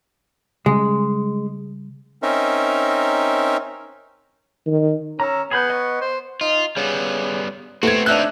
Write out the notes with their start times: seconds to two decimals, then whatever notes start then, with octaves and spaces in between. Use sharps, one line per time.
0.66 C#3 G3 G#3 C#4
2.22 C4 C#4 D#4 A#4 E5
4.67 D#3
5.20 C#4 A#5 E6
5.51 B3 G#4 B5 G6
5.70 D#5 C#6
6.01 C5
6.41 D#4 F4
6.77 C#3 G3 B3
7.83 A3 B3 C4 F#4 G#6
8.06 C4 D4 D#4 E5 F#6